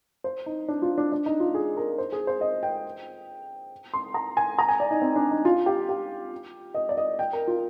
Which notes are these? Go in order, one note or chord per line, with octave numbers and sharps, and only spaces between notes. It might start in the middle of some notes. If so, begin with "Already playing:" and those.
C5
D#4
D4
F4
D4
D4
D#4
F4
G#4
A#4
C5
G#4
C5
D#5
G5
C6
A#5
G#5
A#5
G#5
D5
D#4
C4
D4
D#4
F4
G4
G4
D#5
D5
D#5
G5
A#4
F4